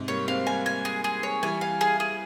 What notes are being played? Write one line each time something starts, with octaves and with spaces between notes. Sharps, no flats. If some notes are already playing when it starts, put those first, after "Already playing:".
Already playing: G#2 C3
G3 A#3 C#5
G#3 C4 F5
G3 A#3 G#5
G#5
G#4
G#4
C#5
E3 G3 G#5
F5
G#4
G#4